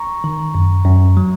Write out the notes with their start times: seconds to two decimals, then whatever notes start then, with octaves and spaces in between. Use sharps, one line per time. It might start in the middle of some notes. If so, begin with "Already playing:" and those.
Already playing: A#5 C#6
0.24 D#3
0.55 F#2
0.85 F#2
1.17 F#3